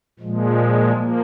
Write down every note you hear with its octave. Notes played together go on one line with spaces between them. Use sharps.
A#2 F3 G#3
F3 A#3